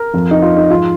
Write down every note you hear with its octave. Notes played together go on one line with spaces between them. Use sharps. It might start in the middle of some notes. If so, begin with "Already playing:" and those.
Already playing: A#4
F2 F3
D#4
F4
D#4
G#2 F3 F4